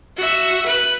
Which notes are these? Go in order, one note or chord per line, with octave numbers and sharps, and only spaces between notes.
F#4 E5
B4 F#6